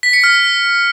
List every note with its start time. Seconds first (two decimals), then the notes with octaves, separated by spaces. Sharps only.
0.03 B6
0.13 C#7
0.24 F6